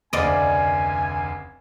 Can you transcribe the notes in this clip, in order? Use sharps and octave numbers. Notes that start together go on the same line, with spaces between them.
F1 D2 C#3 D5 D#5 G#5